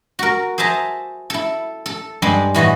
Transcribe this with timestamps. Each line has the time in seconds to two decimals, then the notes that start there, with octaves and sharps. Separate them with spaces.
0.19 F#4 A#4
0.58 G#4 C5 E5 A5 A#5
1.30 E4 A4
1.86 A4
2.22 G2 G3 G#3 D4
2.54 A2 E3 F#4 D#5